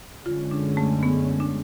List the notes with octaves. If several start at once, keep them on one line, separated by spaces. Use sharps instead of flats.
F#2 D3 G#3 C#4 F4
D4
A3
B3
D4